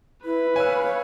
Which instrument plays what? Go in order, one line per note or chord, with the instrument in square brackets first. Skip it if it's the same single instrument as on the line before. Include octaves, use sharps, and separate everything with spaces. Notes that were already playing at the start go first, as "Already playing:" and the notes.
[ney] E4 [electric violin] B4
[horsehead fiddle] C#5 [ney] F5 [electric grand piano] G#5 E6